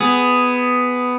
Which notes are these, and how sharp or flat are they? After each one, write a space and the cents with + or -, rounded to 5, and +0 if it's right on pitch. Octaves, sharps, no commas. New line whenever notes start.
B3 +10 G#4 +0